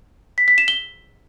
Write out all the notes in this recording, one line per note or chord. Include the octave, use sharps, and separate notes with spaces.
B6
B6
E7
G7